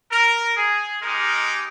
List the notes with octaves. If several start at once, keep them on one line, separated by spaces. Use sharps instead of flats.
A#4
G#4
G#3 D#4 G4 A#4